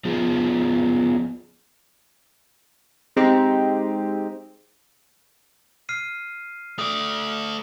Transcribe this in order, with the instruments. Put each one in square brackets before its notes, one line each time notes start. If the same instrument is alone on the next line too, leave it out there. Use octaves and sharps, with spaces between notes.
[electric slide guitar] F3 B3 F4 G#4
[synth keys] G#3 C4 D#4 G4
[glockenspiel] F6 C7 D#7
[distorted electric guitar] A3 D5 [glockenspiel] D#6